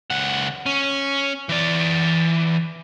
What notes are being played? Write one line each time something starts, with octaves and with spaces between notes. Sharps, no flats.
C#2 F#5
C#4
E3 D5